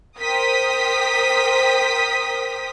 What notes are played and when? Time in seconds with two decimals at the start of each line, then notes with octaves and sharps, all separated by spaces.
0.19 A#4 C5 G5 D#6 B6